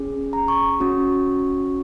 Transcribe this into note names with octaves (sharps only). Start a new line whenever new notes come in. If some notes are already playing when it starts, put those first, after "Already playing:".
Already playing: C#4 G#4
A#5
C#6
C#4 F#4